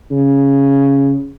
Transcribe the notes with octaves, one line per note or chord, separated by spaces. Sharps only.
C#3